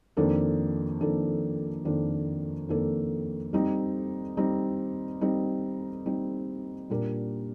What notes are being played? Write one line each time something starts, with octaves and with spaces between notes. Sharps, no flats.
F2 D#3 A#3 D4 A4
F2 D#3 A#3 D4 A4
F2 D#3 A#3 D4 A4
F2 D#3 A#3 D4 A4
G3 C4 D#4
G3 C4 D#4
G3 C4 D#4
G3 C4 D#4
A#2 G3 D4 G4 A#4